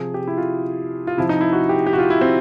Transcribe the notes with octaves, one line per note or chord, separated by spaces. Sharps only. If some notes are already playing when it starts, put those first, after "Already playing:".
Already playing: C3 F3 G#4
G4
E4
F4
F4
C3 F3 E4
D#4
E4
F#4
G4
G4
F#4
F4
E4
C4